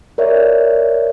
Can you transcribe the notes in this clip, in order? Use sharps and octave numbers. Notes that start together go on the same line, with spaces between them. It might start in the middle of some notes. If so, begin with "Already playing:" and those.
A#4 C#5 D5 E5